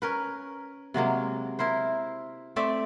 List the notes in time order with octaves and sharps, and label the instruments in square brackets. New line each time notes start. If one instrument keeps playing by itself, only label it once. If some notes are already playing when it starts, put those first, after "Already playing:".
[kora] C#4 A#4 B4
C3 F#3 G#3 A#3
E4 A#4 C5
A3 C4 D5 E5